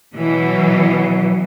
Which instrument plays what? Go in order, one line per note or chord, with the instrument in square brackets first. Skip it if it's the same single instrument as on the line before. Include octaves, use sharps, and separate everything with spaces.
[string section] B2 E3 F#3